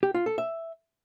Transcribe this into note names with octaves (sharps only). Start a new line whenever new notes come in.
G4
F4
A4
E5